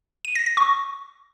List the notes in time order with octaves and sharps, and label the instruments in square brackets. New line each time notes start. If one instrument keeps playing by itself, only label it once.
[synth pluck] D#7
A#6
A#6
C#6